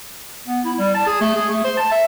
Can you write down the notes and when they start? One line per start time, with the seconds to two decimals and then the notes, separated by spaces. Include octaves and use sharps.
0.48 B3
0.65 E4
0.79 G3
0.94 A5
1.07 G#4
1.21 A3
1.35 G#4
1.49 A3
1.64 C5
1.77 A5
1.91 E5